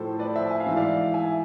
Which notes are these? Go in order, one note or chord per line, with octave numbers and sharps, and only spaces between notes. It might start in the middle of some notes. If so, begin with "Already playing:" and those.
Already playing: A2 F3 A4 C5
B4 D5
C5 E5
G#5
F5
G#2 E3 E5
D5 F5
E5 G#5